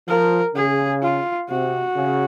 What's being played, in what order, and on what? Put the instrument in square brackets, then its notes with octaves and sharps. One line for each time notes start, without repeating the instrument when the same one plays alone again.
[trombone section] F3 [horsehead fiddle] A#4
[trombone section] C#3 [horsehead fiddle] G#4
[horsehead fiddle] F4
[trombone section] C3 [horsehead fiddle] F#4
[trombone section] C#3